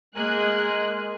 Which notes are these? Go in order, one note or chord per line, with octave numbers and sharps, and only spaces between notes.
G#3 A#3 G#4 A#4 G#5 F#6